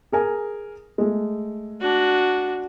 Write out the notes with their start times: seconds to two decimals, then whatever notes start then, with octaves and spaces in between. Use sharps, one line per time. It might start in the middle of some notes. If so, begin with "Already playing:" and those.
0.12 G#4 A#4 G#5
0.98 G#3 A3
1.81 D4 F#4